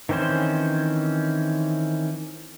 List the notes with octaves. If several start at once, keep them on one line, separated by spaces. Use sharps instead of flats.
D#3 E3 C4 C#4 C5